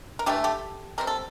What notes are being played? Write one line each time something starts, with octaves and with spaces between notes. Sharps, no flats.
A#4
E3 A3 D4 G4 A4
G4 A4
D3 G3 C4 A#4
A4